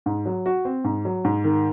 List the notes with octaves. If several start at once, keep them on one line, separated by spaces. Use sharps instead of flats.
G#2
F#3
F#4
C4
G#2
F#3
G#2
D#3